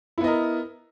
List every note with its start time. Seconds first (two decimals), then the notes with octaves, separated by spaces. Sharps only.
0.18 E4
0.21 B3
0.24 D#5
0.27 A#4